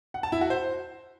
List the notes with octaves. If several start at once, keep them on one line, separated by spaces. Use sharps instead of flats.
F#5
A5
E4
F#4
C5